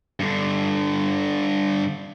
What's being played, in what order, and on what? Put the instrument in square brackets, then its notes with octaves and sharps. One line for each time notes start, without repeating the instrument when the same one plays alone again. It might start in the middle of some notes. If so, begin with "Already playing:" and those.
[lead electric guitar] G2 D3